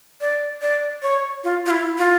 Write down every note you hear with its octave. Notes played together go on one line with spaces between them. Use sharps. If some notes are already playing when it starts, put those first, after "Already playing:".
D5
D5
C#5
F4
F4
E4
F4